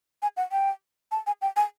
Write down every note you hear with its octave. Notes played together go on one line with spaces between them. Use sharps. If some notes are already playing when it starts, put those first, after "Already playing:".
G#5
F#5
G5
A5
G#5
G5
G#5